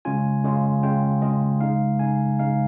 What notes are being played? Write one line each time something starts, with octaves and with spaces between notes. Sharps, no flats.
C#3 G#3 C#4 F4 G#5
C#3 G#3 C#4 F4
C#3 G#3 C#4 F4 G5
C#3 G#3 C#4 F4 D#5
C#3 G#3 D#4 F5
C#3 G#3 D#4 G#5
C#3 G#3 D#4 F5